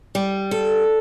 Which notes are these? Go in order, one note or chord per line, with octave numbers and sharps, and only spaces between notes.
G3
A4